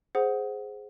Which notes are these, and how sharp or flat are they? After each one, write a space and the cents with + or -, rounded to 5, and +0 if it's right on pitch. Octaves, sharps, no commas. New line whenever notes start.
G#4 +5 C5 +0 F#5 +0